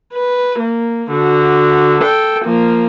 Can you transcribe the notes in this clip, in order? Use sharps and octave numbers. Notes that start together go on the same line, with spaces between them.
B4
A#3
D3 F#4
A4 G5
F3 A#3